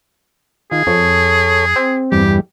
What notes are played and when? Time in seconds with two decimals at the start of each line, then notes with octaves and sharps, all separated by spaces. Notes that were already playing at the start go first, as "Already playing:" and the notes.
0.71 D#3 F4 G#4
0.87 F2 A4 C#5
1.76 C4
2.12 E2 G2 G3 G4